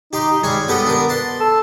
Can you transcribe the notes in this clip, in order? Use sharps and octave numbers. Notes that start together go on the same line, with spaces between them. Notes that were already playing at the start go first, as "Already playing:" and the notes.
D#4 G4 C6
G3 G#3 G#4 C#5
B3 G4 A4 D#5
D4 A#4
A5 C6
A4